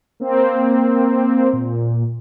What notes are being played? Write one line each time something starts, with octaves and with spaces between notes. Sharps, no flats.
A#3 C4
A#2